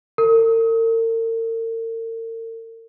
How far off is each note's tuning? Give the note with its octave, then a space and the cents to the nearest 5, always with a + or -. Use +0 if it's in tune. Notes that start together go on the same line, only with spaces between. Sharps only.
A#4 -45